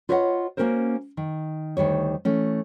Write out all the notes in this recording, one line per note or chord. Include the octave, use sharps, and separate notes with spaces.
F4 B4 C#5 D#5 E5 F#5
A#3 C4 C#4 F#4 A#4 C5
D#3
D2 D#3 G3 C#5
E3 A3 C#4